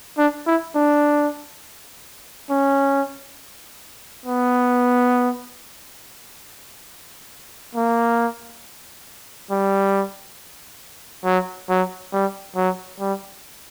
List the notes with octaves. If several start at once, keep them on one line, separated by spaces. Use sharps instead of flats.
D4
E4
D4
C#4
B3
A#3
G3
F#3
F#3
G3
F#3
G3